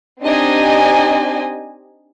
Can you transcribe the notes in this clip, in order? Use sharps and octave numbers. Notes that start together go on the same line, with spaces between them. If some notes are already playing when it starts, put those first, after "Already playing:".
C4 D4 D#4 G4 D#5 G#5